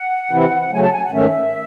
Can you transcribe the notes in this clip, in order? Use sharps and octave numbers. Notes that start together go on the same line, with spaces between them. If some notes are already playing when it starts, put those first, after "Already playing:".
Already playing: F#5
C3 E3 C4 E4
C#3 F#3 A3 G#5
A5
F#5
G#5
F#5
G#2 D#3 A3 C#4 E5